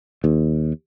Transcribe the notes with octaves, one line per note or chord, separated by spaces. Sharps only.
D#2